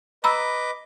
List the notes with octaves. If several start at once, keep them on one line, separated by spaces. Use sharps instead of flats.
B4 D#5 A#5 B5 D6 E6